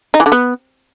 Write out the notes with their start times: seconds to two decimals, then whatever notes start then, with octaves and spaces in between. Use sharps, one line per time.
0.14 D#4
0.20 E3
0.26 D3
0.32 B3